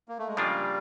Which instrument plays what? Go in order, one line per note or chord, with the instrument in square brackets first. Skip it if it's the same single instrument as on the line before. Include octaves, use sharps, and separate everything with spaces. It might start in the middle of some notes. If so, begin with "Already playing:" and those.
[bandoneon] A#3
A3
G#3
[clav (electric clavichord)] C#3 F3 A#3 D4 F4 [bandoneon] G3